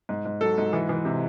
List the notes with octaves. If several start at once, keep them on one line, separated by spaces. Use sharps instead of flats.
G#2
G#2
F#3 A4
G#2
E3
E3
C3